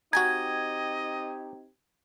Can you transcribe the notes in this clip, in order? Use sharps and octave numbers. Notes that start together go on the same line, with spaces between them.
C4 D#4 F#4 G4 D#5 G#5 A#5 G#6